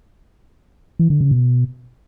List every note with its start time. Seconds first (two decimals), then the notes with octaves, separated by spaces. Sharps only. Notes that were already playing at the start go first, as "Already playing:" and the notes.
0.99 E3
1.10 D3
1.21 C#3
1.31 B2